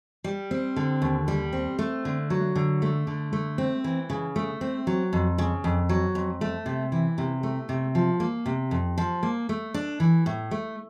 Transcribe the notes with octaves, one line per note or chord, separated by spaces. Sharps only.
G3
C4
D3
D#2
G3
C4
A3
D3
F#3
D3
A3
D3
A3
C4
E3
C#3
A3
C4
F#3
F2
C#3
F2
F#3
F2
A3
C3
E3
C3
A3
C3
F3
A#3
C3
F2
F3
A#3
A3
D4
E3
A2
A3